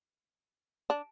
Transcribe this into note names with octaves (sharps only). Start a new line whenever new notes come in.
D4